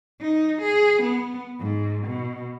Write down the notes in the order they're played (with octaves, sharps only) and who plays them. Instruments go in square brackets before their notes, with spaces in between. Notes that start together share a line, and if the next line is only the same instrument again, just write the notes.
[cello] D#4
G#4
B3
G#2
B2